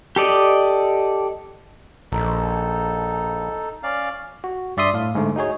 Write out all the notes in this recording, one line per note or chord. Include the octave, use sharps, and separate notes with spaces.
G4 A4 D5 D#5
A#1 D#4 A4
C#4 D5 F5
F#4
G2 D5 E5 C6 D#6
A2 F5
G#2 D3 A3
D#4 F#4 G#4 C#5